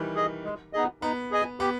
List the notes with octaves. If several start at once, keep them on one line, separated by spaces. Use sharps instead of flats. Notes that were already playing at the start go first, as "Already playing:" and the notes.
Already playing: D#3 E3 G3
G#4 D#5
G#3
B3 D#4 G#4 D#5
B3 D#4
G#4 D#5 G#5
B3 G4